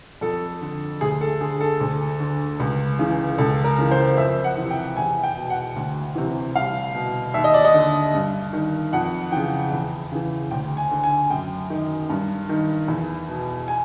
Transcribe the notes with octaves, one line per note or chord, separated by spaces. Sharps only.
F2 A4
D3
D2 G#4
A4
D3 G#4
A4
D2
D3
C#2
C#3 E3
C#2 A4
A#4
C#3 E3
C5
F2 E5
F#5
C3 E3
G5
E2 G#5
G5
B2
F#5
D2
C3 E3
C2 F5
B2
D#2 E5
D#5
D5
D#5
D3
G2
D#3
F2 F#5
C#3 E3 G5
E2
C#3 E3
D2 G5
G#5
D3
G#5
F#2 G5
D#3
G2
D#3
E2
B2
G#5